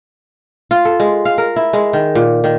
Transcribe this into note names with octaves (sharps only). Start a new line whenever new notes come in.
F4
A4
G#3
F5
A#4
E4
G#3
D#3
A#2
D#3